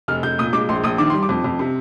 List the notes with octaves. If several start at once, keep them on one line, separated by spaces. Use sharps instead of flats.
F1 F6
F1 G6
A#2 D#6
G#3 D6
A#1 C6
A#1 D#6
D#3 D6
G3 C6
D6
F2
F2
C3